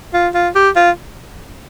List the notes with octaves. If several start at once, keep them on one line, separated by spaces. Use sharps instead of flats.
F4
F4
G4
F4